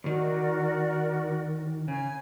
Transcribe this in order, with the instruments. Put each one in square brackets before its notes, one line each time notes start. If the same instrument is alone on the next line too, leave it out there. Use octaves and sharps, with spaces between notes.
[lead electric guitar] D#2 D#3 [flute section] F#4 A#4 D5
[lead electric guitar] C#3 [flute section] G#5